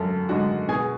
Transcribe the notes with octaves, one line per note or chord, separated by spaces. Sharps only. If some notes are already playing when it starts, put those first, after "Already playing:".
Already playing: F#2 D3 A4 A5
D3 G#3 D4 F#4
B2 G#4 G#5